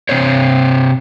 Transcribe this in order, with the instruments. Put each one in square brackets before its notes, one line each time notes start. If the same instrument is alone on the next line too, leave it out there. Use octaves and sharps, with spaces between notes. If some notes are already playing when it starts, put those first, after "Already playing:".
[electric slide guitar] C3 C4 C5 C#5